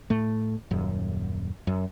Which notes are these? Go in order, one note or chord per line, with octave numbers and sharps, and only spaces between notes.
A2 A3
D#1 F#2
F#2